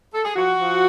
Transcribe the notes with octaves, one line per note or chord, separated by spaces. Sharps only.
A4
G#4
F3 F#4
F3